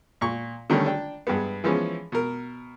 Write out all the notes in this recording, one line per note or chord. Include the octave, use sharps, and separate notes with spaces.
A#2 C#6
D3 D#3 G3 A3 C#4
D4 G5
G2 G#3 B3
E3 F3 G#3 B3 C#4
B2 A#4